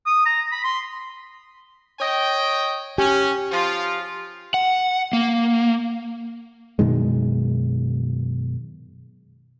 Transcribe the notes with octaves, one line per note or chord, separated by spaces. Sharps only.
D#6
A#5
B5
C6
C#5 D#5 G5
C#4 G4 G#5
F3 F4
F#5
A#3
F#2 B2 D#3 G#3